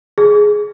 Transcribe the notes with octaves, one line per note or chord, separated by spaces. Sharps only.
G#4